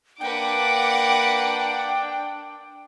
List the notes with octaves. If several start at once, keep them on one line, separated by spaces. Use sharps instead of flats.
A#3 D4 B4 F#5 G5 D6